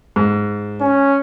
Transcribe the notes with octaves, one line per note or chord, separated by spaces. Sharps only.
G#2
C#4